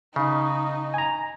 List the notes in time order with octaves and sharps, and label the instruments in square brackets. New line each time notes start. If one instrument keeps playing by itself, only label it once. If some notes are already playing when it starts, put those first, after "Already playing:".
[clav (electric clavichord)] C#3 [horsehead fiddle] D#4
[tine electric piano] G#5 A#5